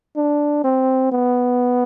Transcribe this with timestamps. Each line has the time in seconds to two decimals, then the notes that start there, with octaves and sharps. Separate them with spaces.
0.16 D4
0.64 C4
1.12 B3